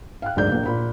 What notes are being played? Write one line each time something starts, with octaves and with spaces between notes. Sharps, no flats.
F5 G5 F#6
F#1 D2 G#2 G#4 D5 G6
A#1 A#3
A#2 B5